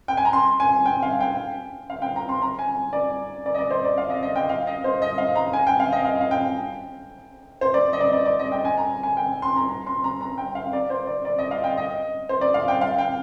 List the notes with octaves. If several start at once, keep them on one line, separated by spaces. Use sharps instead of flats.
G5
G#5
A#5
C6
G#5
G5
F5
G5
F5
G5
A#5
C6
A#5
G#5
D5
D5
D#5
D5
C5
D5
F5
D#5
D#5
G5
F5
D#5
C5
D#5
F5
A#5
G#5
G5
F5
D#5
F5
F5
G5
C5
D5
D#5
D5
D5
D5
D#5
G5
G#5
A#5
G#5
G5
C6
A#5
A#5
C6
A#5
A#5
G5
F5
D5
C5
D5
D5
D#5
F5
G5
D#5
C5
D5
F5
G5
F5
G5